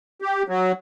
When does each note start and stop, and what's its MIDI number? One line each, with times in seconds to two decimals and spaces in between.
0.22 0.43 67
0.48 0.72 54